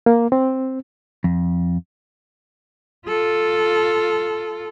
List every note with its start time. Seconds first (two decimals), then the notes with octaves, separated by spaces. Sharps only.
0.06 A#3
0.32 C4
1.24 F2
3.08 F4 A4